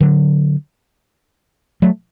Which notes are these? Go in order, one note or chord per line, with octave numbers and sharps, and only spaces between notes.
D3 F#3
F#3 A3